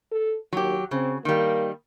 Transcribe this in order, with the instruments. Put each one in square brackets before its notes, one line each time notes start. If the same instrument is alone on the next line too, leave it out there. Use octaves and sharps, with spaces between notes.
[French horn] A4
[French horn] D#2 [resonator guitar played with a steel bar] F#3 G4
[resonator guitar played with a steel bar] C#3 [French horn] C4
[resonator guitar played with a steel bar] D#3 G3 [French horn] A#3